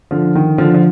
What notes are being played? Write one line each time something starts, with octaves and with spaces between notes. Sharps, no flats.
D3 F3
D#3
D3 F3
F3